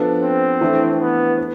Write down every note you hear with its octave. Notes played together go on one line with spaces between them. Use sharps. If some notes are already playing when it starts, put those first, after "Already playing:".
Already playing: F3 B3 D4 A4
C4
E3 A3 D4
B3
B3